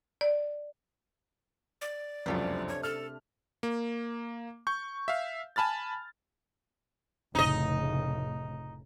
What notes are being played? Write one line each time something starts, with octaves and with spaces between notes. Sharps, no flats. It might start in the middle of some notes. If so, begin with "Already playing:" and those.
D5
D5
F1 C#2 F#2 C3 A3 D4
C#5
A4 F6
A#3
C#6 G6
E5 F5
G#5 A5 B5 F6 A6
F1 A2 C#3 D#4 D#5